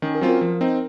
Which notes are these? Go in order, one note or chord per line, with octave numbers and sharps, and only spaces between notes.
D#3 C#4
A#4
F#3 C4 F4
A#4
F3 A#4
C4 D#4